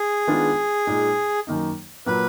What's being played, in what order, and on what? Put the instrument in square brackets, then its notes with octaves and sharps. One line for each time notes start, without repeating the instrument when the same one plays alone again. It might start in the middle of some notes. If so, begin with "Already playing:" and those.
Already playing: [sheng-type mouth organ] G#4
[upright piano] D#3 G#3 B3 D4 F4
A#2 G#3 D#4
F#2 D#3 A#3 D#4
[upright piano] A#2 F#3 A#3 [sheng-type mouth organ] B4